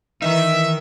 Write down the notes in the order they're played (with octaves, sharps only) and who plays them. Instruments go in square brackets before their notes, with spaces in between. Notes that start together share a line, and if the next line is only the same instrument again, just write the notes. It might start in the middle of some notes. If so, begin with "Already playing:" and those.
[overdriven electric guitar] D#3 D#4 [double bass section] E3 [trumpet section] E5